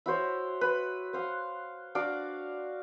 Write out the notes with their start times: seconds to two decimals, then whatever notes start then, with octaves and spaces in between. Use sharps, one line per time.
0.06 E4 F#4 C5 C#5
0.61 B4
1.13 C5 F5 F#5
1.95 D4 F#4 F5 D6